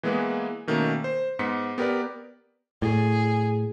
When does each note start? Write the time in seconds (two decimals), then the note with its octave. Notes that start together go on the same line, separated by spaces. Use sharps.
0.03 E3 G#3 A#3 B3 G#4 B4
0.67 B2 D#3 A3 A#3 C#4
1.04 C5
1.39 G#2 B3 B6 C#7
1.78 B3 G4 A#4 B4 D5
2.82 A2 G#4